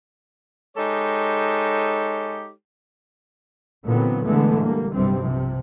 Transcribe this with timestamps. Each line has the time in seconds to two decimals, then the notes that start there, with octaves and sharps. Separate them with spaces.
0.76 G#3 D#4 G4 A4 C#5
3.85 A#2 D3 E3 F#3 B3 C4
4.25 D3 E3 G#3 A3 B3
4.61 G3 A#3
4.94 B1 G2 C3 G3 C4
5.24 C3 F3